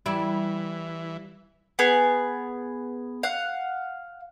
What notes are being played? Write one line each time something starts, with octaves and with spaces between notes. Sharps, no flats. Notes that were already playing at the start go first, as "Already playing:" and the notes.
E3 G3 E4
B3 G#4
F5 F#5